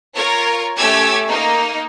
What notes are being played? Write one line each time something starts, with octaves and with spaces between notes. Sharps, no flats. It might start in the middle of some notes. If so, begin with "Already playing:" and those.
F4 A#4 C#5
A3 C#4 G4 D6 E6 G#6
A#3 D#4